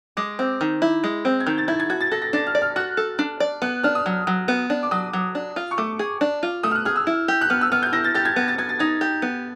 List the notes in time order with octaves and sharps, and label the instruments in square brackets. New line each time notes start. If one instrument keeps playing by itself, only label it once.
[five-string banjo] G#3 [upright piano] D6
[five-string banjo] C4
D#3
E4
G#3
C4
[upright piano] G#6
[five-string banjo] D#3 [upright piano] G6
[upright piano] A6
[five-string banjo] E4 [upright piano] G#6
[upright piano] G#6
[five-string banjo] F#4 [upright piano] G#6
[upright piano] A6
[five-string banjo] A4 [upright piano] A#6
[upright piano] A#6
[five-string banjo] D4 [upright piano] A6
[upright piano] F6
[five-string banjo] D5
[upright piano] F6
[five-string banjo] F#4 [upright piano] F#6
[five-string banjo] A4
D4
D5
[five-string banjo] B3 [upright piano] F#6
[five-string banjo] D4 [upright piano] F6
[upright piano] D#6
[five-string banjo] F#3
F#3
B3
D4
[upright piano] D6
[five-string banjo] F#3 [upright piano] D#6
[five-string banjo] F#3
D4
F4
[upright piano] C#6
[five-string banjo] A3 [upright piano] D6
[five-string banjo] G#4
D4
F4
[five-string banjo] A3 [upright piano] D#6
[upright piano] F6
F#6
[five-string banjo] G#4 [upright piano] F6
[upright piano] E6
[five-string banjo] E4
G4
[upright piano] F#6
[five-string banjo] B3 [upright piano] F6
[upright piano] E6
[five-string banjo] B3 [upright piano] F6
[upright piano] G6
[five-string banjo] E4 [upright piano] A#6
[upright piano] A6
[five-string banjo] G4 [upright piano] A6
[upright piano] G#6
[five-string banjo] B3
[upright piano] A6
[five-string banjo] B3 [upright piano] G#6
[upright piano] A6
[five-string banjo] D#4 [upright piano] G#6
[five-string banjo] G4
B3